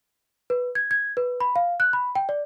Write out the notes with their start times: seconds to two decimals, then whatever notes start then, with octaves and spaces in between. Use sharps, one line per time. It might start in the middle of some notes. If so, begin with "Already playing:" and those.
0.50 B4
0.75 G#6
0.91 G#6
1.17 B4
1.40 B5
1.56 F5
1.80 F#6
1.93 B5
2.15 G5
2.29 D5